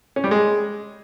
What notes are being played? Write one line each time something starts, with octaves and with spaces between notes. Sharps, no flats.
C#4
G3
G#3